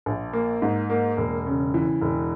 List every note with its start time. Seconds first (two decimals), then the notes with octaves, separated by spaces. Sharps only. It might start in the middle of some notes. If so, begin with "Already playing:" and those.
0.06 A#1
0.33 A#3
0.62 G#2
0.90 A#3
1.17 E1
1.46 C#3
1.74 E3
2.01 E1